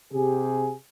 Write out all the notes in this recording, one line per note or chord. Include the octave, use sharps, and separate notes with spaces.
C3 G4 G#4